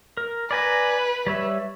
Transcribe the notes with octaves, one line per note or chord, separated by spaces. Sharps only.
A#4
B4 D5 G#5 A#5
G3 C#5 E5